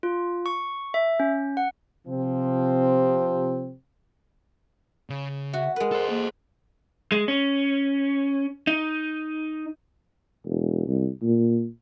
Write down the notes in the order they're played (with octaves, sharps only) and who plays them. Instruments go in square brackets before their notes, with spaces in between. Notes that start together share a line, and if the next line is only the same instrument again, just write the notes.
[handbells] F4
C#6
E5
C#4
F#5
[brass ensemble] C3 F3 C4
[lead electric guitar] C#3
[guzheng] F#4 [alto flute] E5
[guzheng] G#3 B4 [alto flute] A#4
[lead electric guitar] A4 C5
[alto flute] A#3
[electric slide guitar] G#3
C#4
D#4
[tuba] E1
C2
A#2